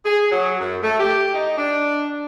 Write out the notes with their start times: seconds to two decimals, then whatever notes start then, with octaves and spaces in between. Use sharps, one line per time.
0.05 G#4
0.31 F#3
0.60 F#2
0.83 A3
0.99 G4
1.34 D#4
1.57 D4